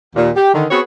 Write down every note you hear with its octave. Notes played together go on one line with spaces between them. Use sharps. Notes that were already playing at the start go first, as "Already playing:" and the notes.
D#2 A#2
G4
D3 D#3
B3 C4 F#4 G#4 B4 C#5